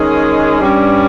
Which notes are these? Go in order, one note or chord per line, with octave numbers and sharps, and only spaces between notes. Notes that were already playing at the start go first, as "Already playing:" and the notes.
Already playing: D#3 G#3 C#4 G#4
G2 G3 C#4